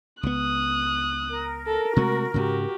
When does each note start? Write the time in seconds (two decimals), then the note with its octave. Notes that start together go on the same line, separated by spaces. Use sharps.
0.23 C#2 B3 D#6 F#6
1.29 A#4
1.67 A4
1.97 C3 G#3 A3 F#4
2.34 G#2 C#3 F#4 G4